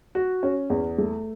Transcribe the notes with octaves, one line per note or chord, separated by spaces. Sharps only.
F#4
C#4
E2
A3